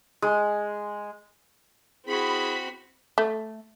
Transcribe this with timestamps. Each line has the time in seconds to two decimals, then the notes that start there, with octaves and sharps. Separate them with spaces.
0.22 G#3
2.06 C4 E4 F#4 G#4 B5
3.18 A3